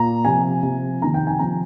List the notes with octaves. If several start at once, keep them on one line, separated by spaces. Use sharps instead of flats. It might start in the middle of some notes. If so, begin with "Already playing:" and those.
Already playing: A#2 A#5
C3 F3 G#5
C3 F3
C3 D#3 A#5
G5
G#5
C3 F3 A#5